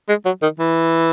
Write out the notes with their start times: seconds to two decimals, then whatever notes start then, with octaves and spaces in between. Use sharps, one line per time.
0.09 G#3
0.25 F#3
0.42 D#3
0.60 E3